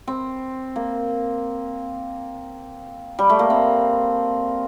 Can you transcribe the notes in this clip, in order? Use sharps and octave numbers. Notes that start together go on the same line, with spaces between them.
C4
A#3
G3
A3
A#3
C4